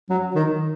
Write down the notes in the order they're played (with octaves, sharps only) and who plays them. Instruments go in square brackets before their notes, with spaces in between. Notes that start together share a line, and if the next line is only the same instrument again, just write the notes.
[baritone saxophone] F#3
D#3